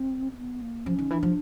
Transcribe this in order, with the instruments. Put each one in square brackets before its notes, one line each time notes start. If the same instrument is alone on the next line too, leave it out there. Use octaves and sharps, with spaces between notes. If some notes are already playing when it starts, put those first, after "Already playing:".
Already playing: [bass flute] C4
C4
B3
A#3
[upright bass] F3 [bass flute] C#4
[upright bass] D#3
[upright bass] E3 [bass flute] D4
[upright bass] F3